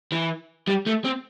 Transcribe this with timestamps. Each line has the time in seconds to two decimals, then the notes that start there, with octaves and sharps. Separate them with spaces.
0.12 E3
0.68 G3
0.86 A3
1.05 C4